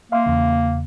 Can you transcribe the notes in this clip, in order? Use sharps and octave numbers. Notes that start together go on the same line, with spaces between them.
A#3 E5 F5 C6
E2 C#3